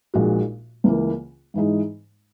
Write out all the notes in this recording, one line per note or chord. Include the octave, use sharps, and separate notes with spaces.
A#1 A#2 G#3 D#4 F#4
C#2 C#3 E3 A#3
G#2 E3 G#3 D#4